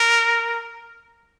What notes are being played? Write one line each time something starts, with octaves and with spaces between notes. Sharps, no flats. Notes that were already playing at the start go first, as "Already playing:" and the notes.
Already playing: A#4